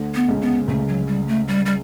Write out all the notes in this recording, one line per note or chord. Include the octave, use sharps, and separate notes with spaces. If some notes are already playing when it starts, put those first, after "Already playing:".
Already playing: D2 D3
B3
C#2 C#3
B3
C#2 C#3 A3
F#3
G3
A3
G3
G3